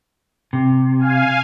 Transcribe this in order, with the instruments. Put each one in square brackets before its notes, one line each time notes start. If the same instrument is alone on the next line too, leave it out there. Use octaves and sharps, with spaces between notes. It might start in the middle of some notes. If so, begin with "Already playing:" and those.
[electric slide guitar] C3
[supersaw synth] F5 G#5